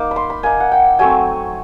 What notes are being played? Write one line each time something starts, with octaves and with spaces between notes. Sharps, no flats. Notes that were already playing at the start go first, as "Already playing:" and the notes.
Already playing: A#3 D#4 D6
B5
C6
B5
A#3 D#4 G#5
F#5
G5
F#3 A3 C4 G#5